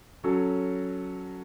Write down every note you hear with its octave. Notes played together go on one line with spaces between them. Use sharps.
F#3 C#4 F#4 A4